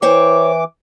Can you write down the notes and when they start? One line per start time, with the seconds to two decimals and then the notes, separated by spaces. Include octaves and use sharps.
0.02 E3 C5 C#5 G5 D6